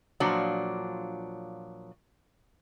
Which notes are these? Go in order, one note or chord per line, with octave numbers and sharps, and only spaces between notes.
A#2 F3 F#3 D4